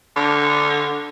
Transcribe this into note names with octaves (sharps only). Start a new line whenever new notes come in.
D3